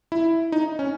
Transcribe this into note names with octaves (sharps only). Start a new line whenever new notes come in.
E4
D#4
C#4